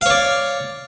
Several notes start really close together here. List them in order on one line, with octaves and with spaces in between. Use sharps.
F5 C#5 D5